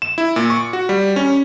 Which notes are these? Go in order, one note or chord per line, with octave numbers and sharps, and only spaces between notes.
E7
E4
A#2
C#6
F#4
G3
C#4